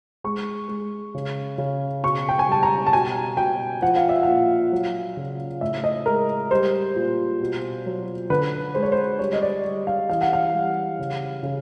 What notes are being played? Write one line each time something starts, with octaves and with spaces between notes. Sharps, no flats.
G#3 C#6
G#3
C#3
C#3
B2 C#6
G5
G#5
G3 A5
A#5
A5
B2 G#5
B2 G5
F3 F#5
F5
E5
A#2 F5
F#3
C#3
A2 E5
D#5
G#3 A#4
G3 C5
A#2
B2
F#3
D3 B4
G#3 C5
C#5
C5
G3 C#5
D#5
D5
G3
F5
E3 F5
F#5
F5
G3
C#3
C#3